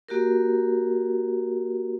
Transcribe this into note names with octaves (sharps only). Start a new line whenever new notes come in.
A#3 F#4 G4 A#4